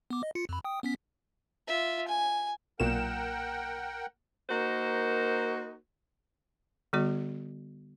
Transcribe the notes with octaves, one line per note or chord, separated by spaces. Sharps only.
B3 D6
D#5
F4 C#7
F2 B5
G5 D#6
B3 C#4 B6
F4 E5
G#5
B1 A#2 A#3 A#4 F#5 G5 E7
A#3 D#4 F#4 A#4 C5
D3 G3 B3 F#4 D#5